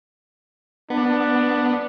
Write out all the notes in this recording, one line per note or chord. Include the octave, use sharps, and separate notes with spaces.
B3 D4